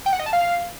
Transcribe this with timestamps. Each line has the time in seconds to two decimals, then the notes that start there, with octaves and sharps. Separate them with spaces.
0.06 G5
0.13 F#5
0.19 D#5
0.26 A5
0.33 F5